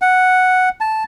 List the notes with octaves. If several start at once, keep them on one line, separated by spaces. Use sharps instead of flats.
F#5
A5